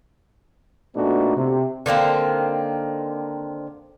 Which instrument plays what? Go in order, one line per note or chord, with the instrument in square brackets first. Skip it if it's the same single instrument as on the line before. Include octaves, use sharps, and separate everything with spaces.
[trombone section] A#2 A3 B3 D4 D#4 F#4
C3
[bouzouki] D3 D#3 A#3 C4